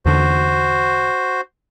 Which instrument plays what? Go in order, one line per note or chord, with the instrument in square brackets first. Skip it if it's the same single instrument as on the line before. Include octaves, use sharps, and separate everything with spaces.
[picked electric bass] E2 D3 [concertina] F#4 C5